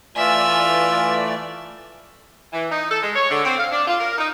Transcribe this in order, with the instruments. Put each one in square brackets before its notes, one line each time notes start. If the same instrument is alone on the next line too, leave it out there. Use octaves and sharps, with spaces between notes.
[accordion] E3 A3 D5 [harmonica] F4 [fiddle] E5 [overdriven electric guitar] G#5
[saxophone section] E3
D#4
A4
G#3
C#5
D3
C4
F5
D4
F4
A#4
D#4